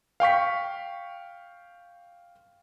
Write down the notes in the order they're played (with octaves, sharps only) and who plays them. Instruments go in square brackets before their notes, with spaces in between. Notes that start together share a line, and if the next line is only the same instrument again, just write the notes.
[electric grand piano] F5 G5 C#6 B6